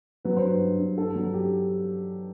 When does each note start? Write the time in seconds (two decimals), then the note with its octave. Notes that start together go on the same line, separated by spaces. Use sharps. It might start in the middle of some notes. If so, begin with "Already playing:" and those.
0.25 F#3 B4
0.36 C5
0.43 G2
0.48 B4
0.61 G2
0.79 G2
0.98 G2 A4
1.16 F#3
1.34 G4